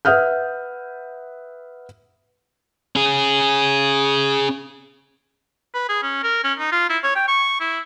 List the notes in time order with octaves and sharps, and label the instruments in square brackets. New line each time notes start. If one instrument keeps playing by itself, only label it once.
[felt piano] B4 E5 F#5 D#6 F6 G6
[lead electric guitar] C#4 G#4
[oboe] B4
G#4
C#4
A#4
C#4
D#4
F4
E4
C#5
G5
C#6
E4